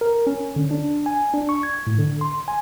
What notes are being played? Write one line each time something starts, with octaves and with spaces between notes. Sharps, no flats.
A#4
C#4
D3
D4
G#5
D4
C#6
G#6
A2
D3
C6
G#5